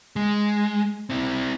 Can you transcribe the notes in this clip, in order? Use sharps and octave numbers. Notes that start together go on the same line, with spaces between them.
G#3
C4 E4